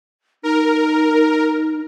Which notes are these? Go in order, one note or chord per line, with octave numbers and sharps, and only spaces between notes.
D#4 A#4